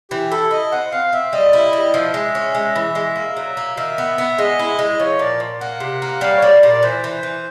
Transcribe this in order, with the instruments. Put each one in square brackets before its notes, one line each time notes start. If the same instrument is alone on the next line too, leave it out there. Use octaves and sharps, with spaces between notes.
[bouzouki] E3 [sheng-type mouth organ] G4
[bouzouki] E4 [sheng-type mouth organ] A4
[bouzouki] E4 [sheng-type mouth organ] D#5
[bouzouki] C4 [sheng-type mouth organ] F#5
[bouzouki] C4 [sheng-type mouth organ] F5
[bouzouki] C4 [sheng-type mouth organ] E5
[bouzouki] G3 [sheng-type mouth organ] D#5
[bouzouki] E4
G3
[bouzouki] F3 [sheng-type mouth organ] E5
[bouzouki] G#3
C#4
G#3
E3
G#3
A#3
F#3
A#3
[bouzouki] D#3 [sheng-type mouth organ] E5
[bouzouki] B3
B3
[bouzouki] G#3 [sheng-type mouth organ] D#5
[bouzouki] E4
G#3
[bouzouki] F3 [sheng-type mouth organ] C#5
[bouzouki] A#2 [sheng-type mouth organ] D5
[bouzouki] A#2
[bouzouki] A#3 [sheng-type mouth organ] F#5
[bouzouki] C3
A#3
[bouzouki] G3 [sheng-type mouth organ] F5
[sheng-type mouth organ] C#5
[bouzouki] G3 [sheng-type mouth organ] D5
[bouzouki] A#2 [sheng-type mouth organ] D5
[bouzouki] E3 [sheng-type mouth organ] C5
[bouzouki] E3
E3